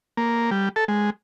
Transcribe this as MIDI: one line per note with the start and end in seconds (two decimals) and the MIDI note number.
0.17 0.50 58
0.51 0.69 55
0.76 0.84 69
0.88 1.10 56